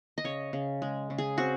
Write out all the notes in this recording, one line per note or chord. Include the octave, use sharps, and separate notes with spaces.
D#5
C#3 C#5
C#3
G#3
C#3
G#4
C4 F#4